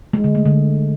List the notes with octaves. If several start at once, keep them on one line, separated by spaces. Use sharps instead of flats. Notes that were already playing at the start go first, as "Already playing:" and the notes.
G#3
D3
A3
D3